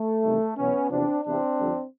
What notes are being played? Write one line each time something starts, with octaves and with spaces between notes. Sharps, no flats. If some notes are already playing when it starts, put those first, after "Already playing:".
Already playing: A3
E2 C3 D#3 G3
E2 B2 F#3 B3 C#4
E2 C3 F3 C4 D4
E2 C3 E3 C4 D4
F2 D3 G3